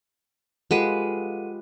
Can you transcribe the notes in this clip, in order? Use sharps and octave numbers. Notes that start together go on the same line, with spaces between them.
G#3 F4 G4 A4 B4 F#5 D#7